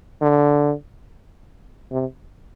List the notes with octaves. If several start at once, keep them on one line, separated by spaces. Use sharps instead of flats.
D3
C3